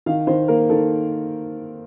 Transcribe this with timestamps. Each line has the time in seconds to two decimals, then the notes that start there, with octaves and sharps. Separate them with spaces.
0.06 D#3 F5
0.27 D#3 C5
0.48 A#3 A#4
0.69 D#3 A4